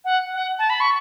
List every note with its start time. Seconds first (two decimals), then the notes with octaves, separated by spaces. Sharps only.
0.05 F#5
0.34 F#5
0.59 A5
0.70 B5
0.80 C#6